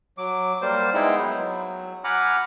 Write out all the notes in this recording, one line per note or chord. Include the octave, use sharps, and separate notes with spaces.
F#3 D6
G3 A#3 C5
G#3 B3 D#4 E4 G5
F#3
F#5 G#5 A#5 B5 D6 F6